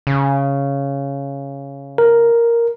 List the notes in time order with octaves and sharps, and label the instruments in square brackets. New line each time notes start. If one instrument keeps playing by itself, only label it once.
[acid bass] C#3
[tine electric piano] A#4